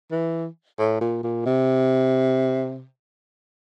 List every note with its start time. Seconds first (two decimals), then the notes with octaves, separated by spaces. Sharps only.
0.11 E3
0.79 A2
1.01 A#2
1.23 A#2
1.46 C3